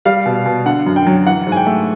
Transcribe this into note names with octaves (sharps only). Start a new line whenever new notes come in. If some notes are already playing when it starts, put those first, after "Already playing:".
G3 F5
B2
B2
D3 F#5
F#2
G5
F#3
E3 F#5
G#2
G#5
G5
A3